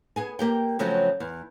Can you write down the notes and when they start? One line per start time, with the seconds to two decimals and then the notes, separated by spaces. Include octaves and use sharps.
0.16 B3 G#4 G#5
0.39 A#3 G4 G5
0.79 C#3 F3 F#3 A3 C4 F#4
1.20 E2